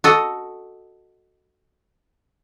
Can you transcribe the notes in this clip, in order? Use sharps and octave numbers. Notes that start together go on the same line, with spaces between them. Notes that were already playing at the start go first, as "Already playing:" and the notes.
F#4 A4 D#5